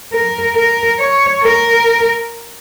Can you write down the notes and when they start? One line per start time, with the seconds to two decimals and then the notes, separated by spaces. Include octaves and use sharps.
0.13 A#4
0.56 A#4
0.99 C#5
1.43 A#4